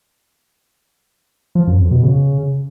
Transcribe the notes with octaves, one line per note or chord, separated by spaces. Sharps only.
F3
F#2
F2
B2
C#3